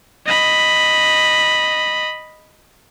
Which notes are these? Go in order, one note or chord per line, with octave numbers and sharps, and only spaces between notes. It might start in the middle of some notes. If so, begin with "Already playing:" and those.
D#5 B5